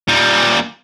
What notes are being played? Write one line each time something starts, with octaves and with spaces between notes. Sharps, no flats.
A#2 G3